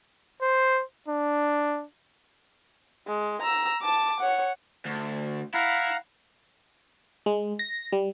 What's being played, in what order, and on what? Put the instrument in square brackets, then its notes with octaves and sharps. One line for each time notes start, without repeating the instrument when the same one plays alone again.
[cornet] C5
D4
[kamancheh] G#3
A#5 E6
A5 D6
C#5 F#5
[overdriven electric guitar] D2
[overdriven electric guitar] E4 [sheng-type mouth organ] F5 F#5 A#5
[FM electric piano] G#3
A#6
G3